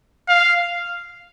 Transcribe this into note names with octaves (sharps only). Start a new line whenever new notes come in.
F5